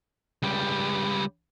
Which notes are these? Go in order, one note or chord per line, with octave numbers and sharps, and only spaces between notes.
C#2 G3